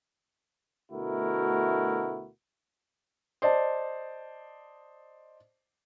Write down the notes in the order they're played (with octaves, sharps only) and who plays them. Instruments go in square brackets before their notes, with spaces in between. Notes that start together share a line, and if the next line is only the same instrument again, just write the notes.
[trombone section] D2 B2 A3 E4 F#4 A#4
[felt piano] C5 D5 D#5 A5